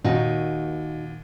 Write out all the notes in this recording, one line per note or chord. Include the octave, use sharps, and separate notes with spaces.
D#2 A#2 D#4 F#4